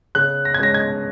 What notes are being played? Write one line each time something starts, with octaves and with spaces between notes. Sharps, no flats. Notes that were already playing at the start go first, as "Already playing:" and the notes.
C#3 F#6
A#6
G#6
G#3 C#4 A#6
G#6